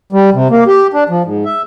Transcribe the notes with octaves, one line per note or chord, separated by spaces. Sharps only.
G3
C3
A#3
G4
D4
F3
G#2
E5